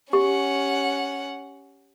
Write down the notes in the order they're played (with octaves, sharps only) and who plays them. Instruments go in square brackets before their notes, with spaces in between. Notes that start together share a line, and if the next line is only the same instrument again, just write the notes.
[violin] C#4 F#5 [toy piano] G4